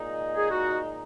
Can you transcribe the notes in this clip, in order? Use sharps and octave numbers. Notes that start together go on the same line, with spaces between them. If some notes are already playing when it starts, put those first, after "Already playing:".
Already playing: A#2 G#3 D#4
G#4
F#4